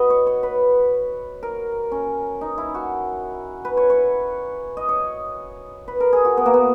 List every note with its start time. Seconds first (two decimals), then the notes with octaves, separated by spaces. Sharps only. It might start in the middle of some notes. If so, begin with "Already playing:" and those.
Already playing: F#4 B4 D#5
0.10 C#5
0.27 C#5
0.43 B4
1.43 A#4
1.92 C#4
2.41 D#4
2.58 E4
2.74 F#4
3.65 B4
3.77 C#5
3.90 C#5
4.77 D#5
4.89 C#5
5.88 B4
6.00 A#4
6.13 G#4
6.25 F#4
6.37 B3
6.46 A#3
6.54 B3